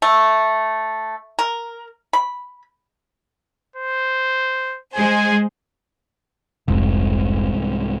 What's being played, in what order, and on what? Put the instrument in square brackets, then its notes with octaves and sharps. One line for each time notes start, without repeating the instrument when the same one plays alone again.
[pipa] A3
A#4
B5
[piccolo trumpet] C5
[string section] G#3 G#4 C5 [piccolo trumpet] G#5
[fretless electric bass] F1 [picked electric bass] C2 G#2